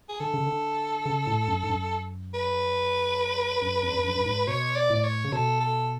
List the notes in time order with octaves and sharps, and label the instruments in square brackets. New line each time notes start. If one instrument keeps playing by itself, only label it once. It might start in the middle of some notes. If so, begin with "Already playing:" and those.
[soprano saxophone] G#4
[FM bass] D3 [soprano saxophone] A4
[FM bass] C#3
D3
C#3
A2
F#2
G#2
F#2
[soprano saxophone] B4
[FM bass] F#2
F2
F2
F#2
F#2
G#2
[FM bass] B2 [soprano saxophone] C#5
[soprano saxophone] D5
[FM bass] A2 [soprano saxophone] D5
[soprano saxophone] C#5
[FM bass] C#3
[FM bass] B2 [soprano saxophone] A4
[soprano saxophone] A4